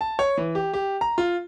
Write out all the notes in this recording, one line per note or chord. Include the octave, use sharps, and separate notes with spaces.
A5
C#5
E3
G4
G4
A#5
F4